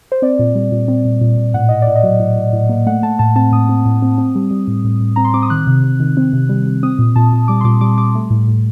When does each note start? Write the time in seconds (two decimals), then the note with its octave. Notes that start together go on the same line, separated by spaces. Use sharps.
0.12 C5
0.22 C4 D5
0.39 A#2
0.55 G3
0.72 A#2
0.88 C4
1.05 A#2
1.21 A#2
1.37 A#2
1.54 A2 F#5
1.69 A2 D#5
1.82 D5
1.87 A2
1.96 D#5
2.03 F#3
2.20 A2
2.36 A2
2.53 A2
2.69 A#3
2.87 A3 F#5
3.03 A3 A5
3.19 A2 A5
3.36 C4 A5
3.52 A2 D#6
3.69 C4
3.85 A2
4.02 C4
4.18 C4
4.35 G3
4.51 G3
4.68 A2
4.84 A2
5.00 A2
5.16 C4 A#5
5.25 C6
5.34 C4 D6
5.43 D#6
5.50 D#3 F#6
5.67 C3
5.84 C3
6.00 D#3
6.17 C4
6.33 C3
6.49 G3
6.66 G3
6.83 C4 D#6
6.99 A#2
7.16 A#2 A5
7.33 A#2
7.48 G3 D6
7.61 C6
7.64 A#2 D6
7.81 G3 D6
7.98 G3 D6
8.15 A3
8.30 A2
8.48 A2